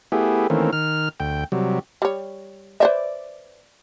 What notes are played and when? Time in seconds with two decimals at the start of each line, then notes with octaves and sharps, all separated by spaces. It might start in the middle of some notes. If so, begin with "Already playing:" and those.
0.12 A3 B3 E4 G4 G#4
0.50 D#3 E3 A3 A#3 C4 C#4
0.73 D#3 F6
1.20 D2 G5
1.52 C3 F#3 G3
2.02 G3 C#5
2.80 B4 C5 D5 E5